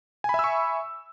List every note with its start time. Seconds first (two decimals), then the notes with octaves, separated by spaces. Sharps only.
0.24 G#5
0.29 B5
0.34 E5
0.39 E6
0.44 C#6